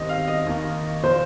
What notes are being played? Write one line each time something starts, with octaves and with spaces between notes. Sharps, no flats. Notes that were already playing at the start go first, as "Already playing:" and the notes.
Already playing: D#2 D#3 G3 C4 D#5
F5
D#5
D#2 D#3 A#3
A#2 F3 A#3 C5